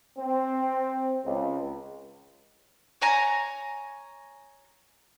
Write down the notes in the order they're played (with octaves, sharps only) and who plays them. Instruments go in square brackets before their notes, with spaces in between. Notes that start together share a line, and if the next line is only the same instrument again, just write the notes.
[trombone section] C4
C#2
[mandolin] C#5 G#5 A#5